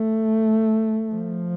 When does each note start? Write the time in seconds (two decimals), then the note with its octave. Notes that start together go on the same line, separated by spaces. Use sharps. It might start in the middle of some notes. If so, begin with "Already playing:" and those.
Already playing: A3
1.15 F3